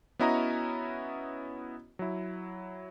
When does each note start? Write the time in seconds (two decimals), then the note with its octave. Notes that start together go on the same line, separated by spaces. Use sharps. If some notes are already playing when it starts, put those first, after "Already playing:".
0.19 B3 C#4 E4 F#4 D#5 A#5
1.99 F#3 E4